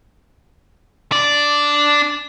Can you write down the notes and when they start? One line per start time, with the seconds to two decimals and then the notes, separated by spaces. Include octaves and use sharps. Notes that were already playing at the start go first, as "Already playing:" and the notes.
1.12 D4 D5